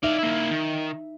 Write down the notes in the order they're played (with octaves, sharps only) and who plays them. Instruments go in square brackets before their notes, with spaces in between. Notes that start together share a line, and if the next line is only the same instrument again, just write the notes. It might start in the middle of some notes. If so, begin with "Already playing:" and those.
[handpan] D#4 E5 [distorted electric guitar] D5 F5
[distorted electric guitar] A#3 E4
D#3